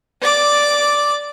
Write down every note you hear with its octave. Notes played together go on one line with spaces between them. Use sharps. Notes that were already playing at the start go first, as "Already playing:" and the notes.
D5 D6